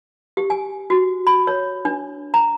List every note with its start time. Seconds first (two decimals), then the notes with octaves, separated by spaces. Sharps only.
0.37 G4
0.50 G#5
0.90 F#4
1.27 B5
1.47 C#5
1.85 D4
2.34 A#5